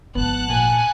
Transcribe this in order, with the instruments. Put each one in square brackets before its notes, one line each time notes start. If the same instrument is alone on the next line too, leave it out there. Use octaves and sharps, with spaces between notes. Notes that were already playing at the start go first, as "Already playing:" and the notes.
[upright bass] G#1 F3 [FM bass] B3 [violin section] F#5 A5 F#6
[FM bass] A#2 [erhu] G#5